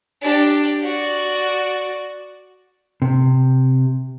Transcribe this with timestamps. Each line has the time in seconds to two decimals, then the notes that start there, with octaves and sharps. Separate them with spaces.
0.22 D4 G4
0.84 F#4 D5
3.02 C3